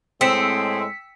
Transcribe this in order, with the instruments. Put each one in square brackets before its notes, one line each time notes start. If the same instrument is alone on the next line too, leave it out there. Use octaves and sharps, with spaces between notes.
[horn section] A2 G#3 [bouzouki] C4 [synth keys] E6 B6 C#7